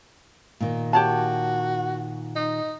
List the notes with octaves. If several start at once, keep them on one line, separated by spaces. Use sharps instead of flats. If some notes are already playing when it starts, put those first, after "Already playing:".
A#2 D#3
F#4 G4 C#5 A5
D#4